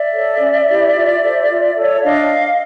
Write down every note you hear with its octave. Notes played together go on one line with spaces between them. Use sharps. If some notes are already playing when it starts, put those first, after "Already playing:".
Already playing: D5 E5
A4 C#5
C#4
E4 G4
F4
A4 C5
F4
A4 C#5
D4 D#5 F5